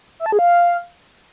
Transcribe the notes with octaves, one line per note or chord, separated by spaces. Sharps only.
E5
A5
G#4
F5